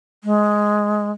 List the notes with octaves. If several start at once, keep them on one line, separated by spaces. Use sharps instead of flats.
G#3